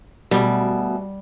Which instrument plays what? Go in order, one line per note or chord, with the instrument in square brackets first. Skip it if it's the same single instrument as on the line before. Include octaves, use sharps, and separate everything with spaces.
[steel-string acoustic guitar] D2 B2 [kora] G3